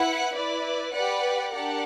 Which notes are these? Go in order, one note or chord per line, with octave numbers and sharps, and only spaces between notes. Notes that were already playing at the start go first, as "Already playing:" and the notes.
Already playing: E4 B4 F#5
E4 B4 D5
G4 B4 D5 F#5
D4 G4 A#4 D5 F#5